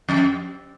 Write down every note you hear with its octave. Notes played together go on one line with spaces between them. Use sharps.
F2